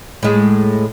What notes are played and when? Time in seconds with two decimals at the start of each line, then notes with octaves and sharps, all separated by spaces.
0.23 A2 G#3